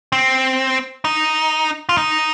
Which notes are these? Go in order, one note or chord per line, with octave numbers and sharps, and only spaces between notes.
C4
D#4
F4
D#4